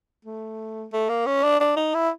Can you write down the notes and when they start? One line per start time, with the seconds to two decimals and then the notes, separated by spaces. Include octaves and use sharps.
0.25 A3
0.93 A3
1.09 A#3
1.26 C#4
1.43 D4
1.60 D4
1.77 D#4
1.94 E4